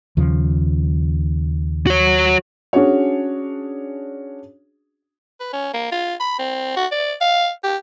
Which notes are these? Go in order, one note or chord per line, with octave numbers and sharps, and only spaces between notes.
D#2 C#3 F3
F#4 C#5
C#4 D4 F#4 G#4 C#5
B4
C#4
A#3
F4
B5
C4
F#4
D5
F5
G4